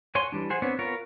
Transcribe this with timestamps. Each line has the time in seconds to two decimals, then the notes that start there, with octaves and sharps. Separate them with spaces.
0.15 F#4 C#5 G#5 C6
0.32 E3 G3 D4
0.50 G#4 C5 F#5 G#5
0.62 B3 C4 D4 C5 C#5
0.79 B3 F4 A#4 C#5